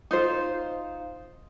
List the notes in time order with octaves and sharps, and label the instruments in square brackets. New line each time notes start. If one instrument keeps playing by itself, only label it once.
[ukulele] D#4 F4 C5